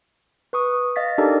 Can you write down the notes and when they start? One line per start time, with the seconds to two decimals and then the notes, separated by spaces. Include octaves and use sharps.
0.53 B4 C#6 D#6
0.96 D#5 F5 A6 B6
1.18 D4 D#4 G4 A4 A#4 D5